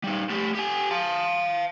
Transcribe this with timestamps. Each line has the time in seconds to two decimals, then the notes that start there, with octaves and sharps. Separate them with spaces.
0.04 G3 D#4
0.30 A3 G4
0.55 G4 G#5
0.91 F5 A5